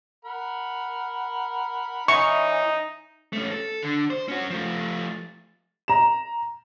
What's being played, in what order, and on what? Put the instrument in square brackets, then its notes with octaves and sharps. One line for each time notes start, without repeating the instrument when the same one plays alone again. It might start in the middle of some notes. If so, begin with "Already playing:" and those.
[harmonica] A#4 F#5 B5
[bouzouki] E3 C#4 [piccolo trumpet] D#4 [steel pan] C#6
[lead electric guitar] A3 C#4
A4
D3
C5
C#4 F#4
F3 A3
[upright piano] A#5 E7